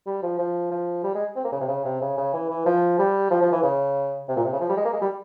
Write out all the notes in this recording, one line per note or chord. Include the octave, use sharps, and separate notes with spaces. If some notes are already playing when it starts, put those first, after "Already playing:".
G3
F3
F3
F3
G3
G#3
C4
A#3
C#3
C3
C#3
C3
C#3
C#3
E3
E3
F3
G3
F3
F3
E3
C#3
C3
A#2
C3
C#3
F3
G3
G#3
A#3
G#3
G3